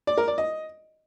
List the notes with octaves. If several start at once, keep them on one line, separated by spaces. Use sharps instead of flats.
D5
A#4
D5
D#5